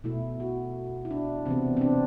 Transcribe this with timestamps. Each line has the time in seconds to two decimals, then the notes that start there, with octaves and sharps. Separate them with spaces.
0.04 B2 A3 E4
0.40 F#4
1.05 E4
1.11 D4
1.46 C3 E3 B3 C4
1.77 C4
1.81 D4